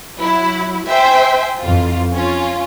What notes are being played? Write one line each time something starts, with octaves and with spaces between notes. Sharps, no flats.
F#3 E4
C5 E5 G5 G#5
F2 E3 F4
C#4 F4